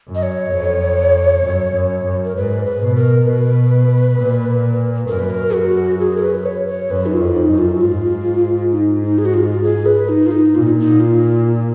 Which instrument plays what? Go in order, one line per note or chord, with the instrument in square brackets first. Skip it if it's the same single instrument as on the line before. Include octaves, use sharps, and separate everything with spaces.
[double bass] F#2
[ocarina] D#5
C#5
[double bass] F2
F#2
F#2
F#2
[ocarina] A#4
[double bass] G#2 [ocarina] B4
[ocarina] B4
[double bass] B2
[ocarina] A#4
[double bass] B2 [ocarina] B4
[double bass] A#2
[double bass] F#2 [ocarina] A#4
[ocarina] B4
A#4
F#4
G#4
A#4
B4
C#5
C#5
[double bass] F#2 [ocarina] B4
[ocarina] D#4
F4
[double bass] F2
[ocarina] D#4
[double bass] F#2
[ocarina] F4
F#4
[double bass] G#2 [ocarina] F4
[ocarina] D#4
D#4
G#4
F#4
F4
G#4
B4
D#4
F4
D#4
[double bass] A#2 [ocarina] F4
[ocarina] D#4
D#4
F4